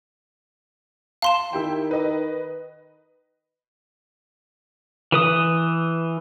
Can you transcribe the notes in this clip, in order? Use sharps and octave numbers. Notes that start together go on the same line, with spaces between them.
F5 A5 C6 E7
D#3 E4 G4 G5
B4 D#5
E3 B4 D#6